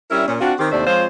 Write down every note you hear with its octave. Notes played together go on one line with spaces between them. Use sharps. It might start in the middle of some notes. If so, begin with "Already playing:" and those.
G3 C#4 D4 E4 A#4 E5
A#2 C#4
C4 D4 F4 F#4
D#3 C4 G4
D#2 C3 A3 D4 C5 D5
F3 G#3 C4 F4 C5 C#5